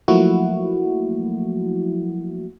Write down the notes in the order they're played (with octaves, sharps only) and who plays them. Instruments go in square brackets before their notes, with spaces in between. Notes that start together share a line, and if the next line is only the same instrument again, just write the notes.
[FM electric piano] F3 F#3 A3 A#3 E4 F#4